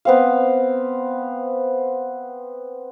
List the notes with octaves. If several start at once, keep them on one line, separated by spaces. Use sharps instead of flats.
B3 C4 F5